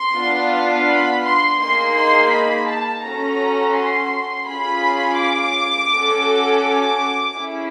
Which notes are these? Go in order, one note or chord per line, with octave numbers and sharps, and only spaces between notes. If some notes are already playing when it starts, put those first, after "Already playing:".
Already playing: C6
B3 D4 F4
B5
C6
A#3 D#4 G#4 C6
C6
B5
A5
C#4 F#4 A4 A#5
C6
C#4 F4 G#4 B5
D6
C#4 F#4 A4
D6
C#4 E4 G#4